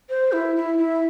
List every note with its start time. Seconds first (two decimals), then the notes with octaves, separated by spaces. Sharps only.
0.09 C5
0.32 E4
0.56 E4
0.78 E4